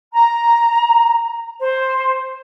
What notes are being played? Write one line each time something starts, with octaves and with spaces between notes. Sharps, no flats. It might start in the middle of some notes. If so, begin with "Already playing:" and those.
A#5
C5